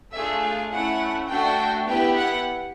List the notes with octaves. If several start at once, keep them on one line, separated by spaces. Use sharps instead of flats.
A3 D4 F4 G#4 E5
F5
A3 C#4 E4 F#5
A3 D4 F#4 A4 G5
B3 E4 G4 G5
F#5